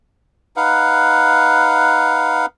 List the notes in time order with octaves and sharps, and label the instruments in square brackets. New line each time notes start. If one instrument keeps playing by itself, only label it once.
[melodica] D#4 B4 F5 F#5